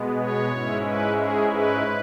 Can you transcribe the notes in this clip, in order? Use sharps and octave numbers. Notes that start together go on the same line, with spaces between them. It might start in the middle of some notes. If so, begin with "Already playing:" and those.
Already playing: B2 G#3 B3
C#5
G#2 G#3 C#4 E4
B4
G#4
B4